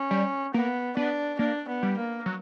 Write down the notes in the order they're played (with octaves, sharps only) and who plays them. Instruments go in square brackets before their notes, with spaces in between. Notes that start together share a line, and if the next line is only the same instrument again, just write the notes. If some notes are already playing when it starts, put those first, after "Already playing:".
Already playing: [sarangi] C#4
[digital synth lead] G3
[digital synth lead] A#3 [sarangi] B3
[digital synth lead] B3 [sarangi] D4
[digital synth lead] A#3 [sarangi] D4
[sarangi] B3
[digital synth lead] G3
[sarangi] A#3
[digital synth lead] F#3